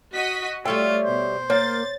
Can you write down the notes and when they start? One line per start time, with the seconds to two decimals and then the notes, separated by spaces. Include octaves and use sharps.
0.14 F#4 D#5 B6
0.65 G3 A3 F4 C#5 E5 G5
1.05 B2 C5
1.50 A#3 C#5 A6